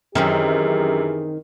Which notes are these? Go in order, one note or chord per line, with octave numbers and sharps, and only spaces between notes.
F#2 D#3 E3 C4 C#4 G4 G#4